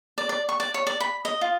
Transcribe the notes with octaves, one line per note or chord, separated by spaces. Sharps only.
D5
D5
C#6
D5
C#5
D5
B5
D#5
F4